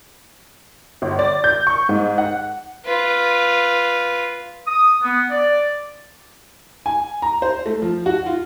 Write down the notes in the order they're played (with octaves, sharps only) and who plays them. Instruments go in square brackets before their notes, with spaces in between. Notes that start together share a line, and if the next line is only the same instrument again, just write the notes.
[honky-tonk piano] G1
D5
G6
C#6
G#2
F#5
[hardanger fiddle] F4 B4
[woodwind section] D#6
B3
D5
[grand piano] G#5
A#5
C5
A3
F3
F#4
F4